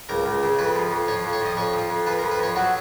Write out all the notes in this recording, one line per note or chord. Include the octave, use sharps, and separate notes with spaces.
C#2 A#4
C#2
C#3
F2 B4
F3
F2
F3 C#5
F2
C#5
F3 D#5
F2 C#5
F3
F2
F3 B4
A#4
F2
B4
F3 C#5
F#3 F#4